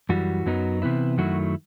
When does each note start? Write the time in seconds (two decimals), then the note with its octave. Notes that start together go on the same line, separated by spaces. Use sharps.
0.09 F#2 E3 G3 F#4
0.46 F#2 F#3 B3 D#4
0.82 C3 E3 B3 E4
1.18 F#2 D#3 F#3 A3 E4 F#4